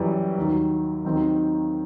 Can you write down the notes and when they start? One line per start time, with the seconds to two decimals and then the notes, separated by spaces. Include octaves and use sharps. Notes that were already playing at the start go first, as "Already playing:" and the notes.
Already playing: F#2 E3 G3
0.38 D#2 D#3 F#3
1.05 D#2 D#3 F#3 C4 D#4